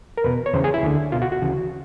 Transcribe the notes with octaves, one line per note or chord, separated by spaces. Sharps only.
A#4
E2 B2 B4
C#5
E2 C#3 E3 C5
G#4
E4
D2 D3
C#2 B2 F4
F#4
F#4
D2 C#3 E3